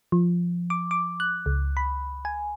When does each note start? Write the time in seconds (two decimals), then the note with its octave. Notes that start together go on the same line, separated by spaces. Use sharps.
0.12 F3
0.70 D6
0.91 D6
1.20 F#6
1.46 C#2
1.77 B5
2.25 G#5